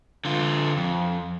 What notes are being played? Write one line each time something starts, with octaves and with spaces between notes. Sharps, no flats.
D3 F4
F2